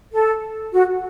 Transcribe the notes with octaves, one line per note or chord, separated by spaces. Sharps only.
A4
F#4